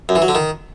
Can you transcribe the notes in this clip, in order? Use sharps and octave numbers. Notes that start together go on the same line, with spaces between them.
F#2
E3
F#3
D3
D#3